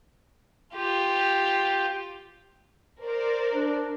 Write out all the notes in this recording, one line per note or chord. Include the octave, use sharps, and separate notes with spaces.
F4 G4
A#4 C5 D5
D4